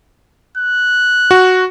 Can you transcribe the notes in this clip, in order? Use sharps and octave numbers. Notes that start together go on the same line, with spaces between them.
F#6
F#4